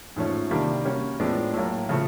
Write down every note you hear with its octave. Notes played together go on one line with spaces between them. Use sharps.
G#2 F3 A3 C#4
C3 D#3 G3 A#3 D4
G3 A#3 C#4 F#4
A2 F3 G#3 B3 D4
A2 F#3 A#3
C#3 F3 A3